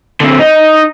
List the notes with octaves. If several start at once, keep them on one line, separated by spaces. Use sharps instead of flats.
D3 C4
D#4